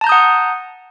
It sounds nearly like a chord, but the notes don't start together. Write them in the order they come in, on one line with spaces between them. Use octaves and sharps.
A5 A#5 G6 D#6 F#5